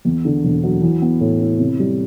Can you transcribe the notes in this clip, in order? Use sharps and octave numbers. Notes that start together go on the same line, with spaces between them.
E2
D3
E1
F#3
E3
B3
A2
E4
C3
G3